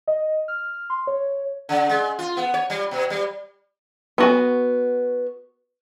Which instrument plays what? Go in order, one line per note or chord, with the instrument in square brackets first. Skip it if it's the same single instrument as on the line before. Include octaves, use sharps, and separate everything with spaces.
[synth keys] D#5
F6
C6
C#5
[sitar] C#3
G#3
F4
B3
C#5
G3
B2
G3
[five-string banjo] B3 F#4 G#5